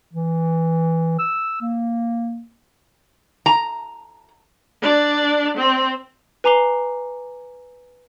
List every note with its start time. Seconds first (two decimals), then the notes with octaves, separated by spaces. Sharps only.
0.14 E3
1.19 E6
1.61 A#3
3.46 A#5
4.82 D4 D5
5.57 C4
6.44 B4 G#5 A#5 D6 C7 G7